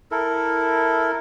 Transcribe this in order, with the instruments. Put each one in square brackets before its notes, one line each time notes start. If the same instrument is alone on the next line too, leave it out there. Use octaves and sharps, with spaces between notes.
[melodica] E4 A4 A#4